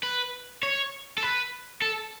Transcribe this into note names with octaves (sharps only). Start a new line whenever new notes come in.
B4
C#5
A4
B4
A4